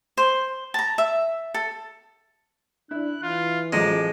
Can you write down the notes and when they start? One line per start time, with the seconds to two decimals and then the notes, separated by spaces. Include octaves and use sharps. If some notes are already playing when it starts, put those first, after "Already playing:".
0.17 C5
0.74 A5 A#5
0.98 E5
1.54 A4
2.91 D4 E4 F#6
3.23 E3 F4
3.73 A1 F3 F#3 G#3 D6